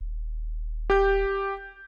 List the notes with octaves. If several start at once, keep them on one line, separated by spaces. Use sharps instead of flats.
D#1
G4 G6